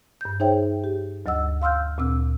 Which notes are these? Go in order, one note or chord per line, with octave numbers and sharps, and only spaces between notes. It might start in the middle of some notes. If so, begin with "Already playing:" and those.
G2 G6
D#4 G#4 C5 C#5 E5 G5
G4
D2 F#3 D#5 F#5 E6
F5 C6 E6 F6 G6
D2 A#2 C4 E6